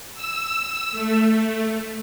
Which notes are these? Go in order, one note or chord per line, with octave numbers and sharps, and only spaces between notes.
E6
A3